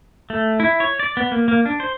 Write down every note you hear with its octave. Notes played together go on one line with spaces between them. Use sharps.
A3
E4
C#5
D5
B3
A#3
A#3
D4
C5